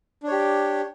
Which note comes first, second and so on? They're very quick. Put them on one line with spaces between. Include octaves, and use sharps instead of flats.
D4 C#5 G4